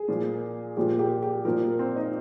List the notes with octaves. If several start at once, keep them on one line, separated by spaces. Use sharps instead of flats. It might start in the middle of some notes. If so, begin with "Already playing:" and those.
Already playing: G#4
A#2 F3
A#2 F3 G4
G4
G4
A#2 F3 A#4
C4
D#4